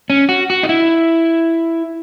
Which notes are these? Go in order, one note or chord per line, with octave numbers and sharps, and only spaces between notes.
C#4
F#4
F#4
D#4
E4